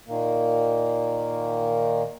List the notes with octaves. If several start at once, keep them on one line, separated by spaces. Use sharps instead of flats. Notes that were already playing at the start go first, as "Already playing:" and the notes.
A#2 D#3 A#3